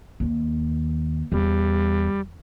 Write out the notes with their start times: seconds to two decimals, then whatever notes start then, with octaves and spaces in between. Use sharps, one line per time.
0.20 D#2
1.32 E2 G3